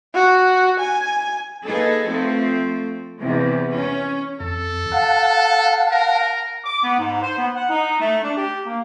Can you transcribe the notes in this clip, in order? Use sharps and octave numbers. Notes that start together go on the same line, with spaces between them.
F#4
G#5
A#3 D#4 G#4 A4 B4
F3 A3 C4
E2 C3
C#4
F2 A4
F5 F#5 A5
A#4
D6
B3
G#2
C5
B3
F#5
D#4
A3
D4
G4
A#3